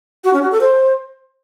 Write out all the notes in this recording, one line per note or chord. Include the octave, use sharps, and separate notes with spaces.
F#4
C#4
F#4
A4
C5